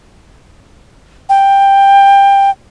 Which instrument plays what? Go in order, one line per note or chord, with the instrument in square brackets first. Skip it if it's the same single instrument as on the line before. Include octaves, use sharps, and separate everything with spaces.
[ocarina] G5